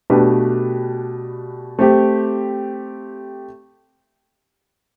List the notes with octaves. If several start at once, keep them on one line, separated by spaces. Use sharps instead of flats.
B2 A3 D4 G4 B4
A3 C4 G4